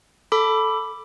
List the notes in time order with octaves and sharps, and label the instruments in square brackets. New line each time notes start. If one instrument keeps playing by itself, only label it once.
[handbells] A4 B5 D6